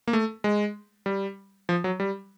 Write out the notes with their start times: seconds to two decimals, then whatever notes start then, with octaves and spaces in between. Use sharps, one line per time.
0.08 A#3
0.13 A3
0.44 G#3
1.06 G3
1.69 F3
1.84 F#3
2.00 G3